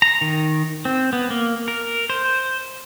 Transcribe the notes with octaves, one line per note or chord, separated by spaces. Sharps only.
A#5
D#3
C4
B3
A#3
A#4
C5